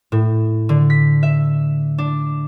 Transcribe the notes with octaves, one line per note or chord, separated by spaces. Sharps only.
A2
D3
B6
E5
D4